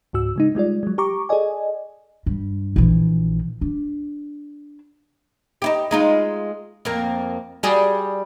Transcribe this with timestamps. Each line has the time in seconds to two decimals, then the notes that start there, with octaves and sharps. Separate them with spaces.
0.13 C#2 G#2 F#4 E6
0.36 C#3 G#3 D#4
0.55 G3 G#3 F4 D5
0.83 F#3 G#3
0.98 G4 A#5 C#6 D6
1.29 G#4 A4 D5 D#5 G#5
2.26 G2
2.76 A#1 E3
3.61 D4
5.62 D#4 E4 G4
5.91 G#3 D#4 F4
6.85 F2 A#3
7.63 G3 F#4 G#4